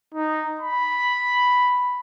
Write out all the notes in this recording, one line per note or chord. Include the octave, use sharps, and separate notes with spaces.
D#4
B5